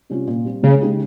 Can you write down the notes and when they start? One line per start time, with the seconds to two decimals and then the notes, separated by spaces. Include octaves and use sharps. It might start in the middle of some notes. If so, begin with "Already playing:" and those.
0.10 C3 G3 C#4 F4
0.27 A#2
0.45 G3 C4
0.63 C#2 C#3
0.81 C#3 G#3 D#4 G4